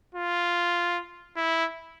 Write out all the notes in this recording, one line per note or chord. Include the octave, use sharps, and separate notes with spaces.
F4
E4